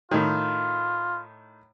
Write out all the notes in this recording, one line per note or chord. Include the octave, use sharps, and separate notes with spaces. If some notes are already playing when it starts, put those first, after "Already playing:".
A2 D#3 F4